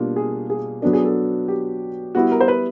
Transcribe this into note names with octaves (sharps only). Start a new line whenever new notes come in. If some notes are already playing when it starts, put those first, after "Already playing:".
Already playing: B2 G3 A#3 D4 F4
G#4
G#4
F#3 B3 D4 A4
G#4
A4
G4
G3 B3 E4 F#4
A#4
C5
B4